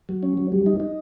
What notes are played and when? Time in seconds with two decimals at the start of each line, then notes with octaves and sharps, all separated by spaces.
0.09 F#3
0.23 C#4
0.37 F#3
0.52 G3
0.66 D#4
0.80 D#4